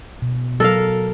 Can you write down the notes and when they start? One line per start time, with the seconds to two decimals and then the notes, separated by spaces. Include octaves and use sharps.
0.22 B2
0.60 F#3 A4 A#4 F5